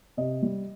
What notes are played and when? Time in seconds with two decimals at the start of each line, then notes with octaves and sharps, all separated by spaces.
0.17 C3 D#5
0.43 G3